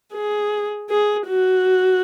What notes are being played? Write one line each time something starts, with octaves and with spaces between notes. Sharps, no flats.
G#4
G#4
F#4